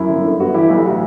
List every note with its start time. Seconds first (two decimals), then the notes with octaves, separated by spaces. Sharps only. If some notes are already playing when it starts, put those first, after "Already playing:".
Already playing: F#2 E4
0.09 G1
0.25 D3
0.40 B3 F#4
0.54 E3 E4 G4
0.70 B1 E4
0.80 E4
0.85 A2 F#4